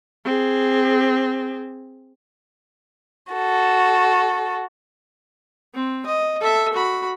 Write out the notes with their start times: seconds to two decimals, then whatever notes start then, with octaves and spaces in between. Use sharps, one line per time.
0.25 C4 G#4
3.33 F#4 A4
5.74 C4
6.06 D#5
6.41 A4 E5
6.73 F#4 B5